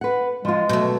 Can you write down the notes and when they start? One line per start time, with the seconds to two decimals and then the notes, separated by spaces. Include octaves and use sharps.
0.01 B4 F#5
0.45 F3 G#3 F4
0.69 B2 F#3 A3